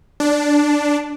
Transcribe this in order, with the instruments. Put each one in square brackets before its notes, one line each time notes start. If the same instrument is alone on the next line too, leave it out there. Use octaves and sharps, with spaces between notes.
[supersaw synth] D4